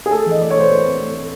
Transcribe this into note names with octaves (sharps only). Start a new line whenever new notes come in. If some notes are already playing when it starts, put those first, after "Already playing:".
G#4
A3 A4
E3
D#5
A3 D5
A3 C#5
C5
A3 B4
C4
A3
A3